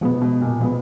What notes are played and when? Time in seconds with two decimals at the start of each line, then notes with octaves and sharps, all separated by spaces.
0.01 B2 F3 G#3 B3
0.21 B2
0.41 A#2
0.61 B2 F3 G#3 B3